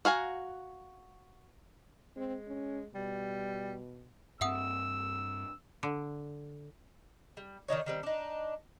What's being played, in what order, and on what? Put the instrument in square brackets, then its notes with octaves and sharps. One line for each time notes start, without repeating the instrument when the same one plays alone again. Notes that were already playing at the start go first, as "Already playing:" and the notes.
[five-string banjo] F#4 F5 G#5 A#5
[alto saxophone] G#3 [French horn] C4
[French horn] C#4
[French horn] B2 [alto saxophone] G3
[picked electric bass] G2 C4 [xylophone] E5 F#5 D#6 [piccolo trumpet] E6
[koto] D3
[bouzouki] G3
D#3 D4 D#4 C#5
D#3 G3 C4
D4 D#4